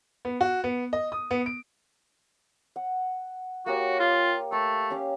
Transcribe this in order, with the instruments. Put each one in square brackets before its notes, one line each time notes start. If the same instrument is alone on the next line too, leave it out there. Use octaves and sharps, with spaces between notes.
[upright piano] B3
F#4
B3
D#5
D#6
B3
D7
[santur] F#5
[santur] A#3 G4 C#5 [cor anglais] F#4
[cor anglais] F4
[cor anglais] A3 [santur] E6
[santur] C#4 G4 F5